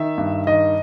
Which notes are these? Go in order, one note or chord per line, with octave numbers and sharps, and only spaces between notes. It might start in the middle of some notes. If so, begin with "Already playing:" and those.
Already playing: D#3 E5
G2
D#3 D#5